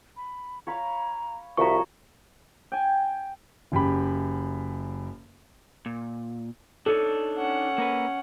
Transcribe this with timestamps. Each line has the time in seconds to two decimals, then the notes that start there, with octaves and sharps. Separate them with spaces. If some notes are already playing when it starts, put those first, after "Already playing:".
0.17 B5
0.67 C#5 F5 A#5 B5
1.57 C2 F3 F#4 C#5 E5 A#5 C#6
2.72 G5 G#5
3.72 F#1 F#2 G4 B5
5.86 A#2
6.86 D4 D#4 A4 C#5
7.37 C#4 F#5
7.78 A#3 A#4 B4